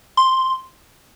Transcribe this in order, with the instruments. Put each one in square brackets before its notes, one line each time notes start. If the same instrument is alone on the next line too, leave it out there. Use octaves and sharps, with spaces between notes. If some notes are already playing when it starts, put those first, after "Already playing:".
[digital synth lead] C6